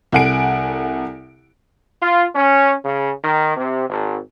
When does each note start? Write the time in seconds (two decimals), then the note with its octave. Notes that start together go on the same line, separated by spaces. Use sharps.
0.12 C2 A4 F#5 G#5 D7
2.02 F4
2.35 C#4
2.85 C#3
3.24 D#3
3.57 C3
3.90 G#1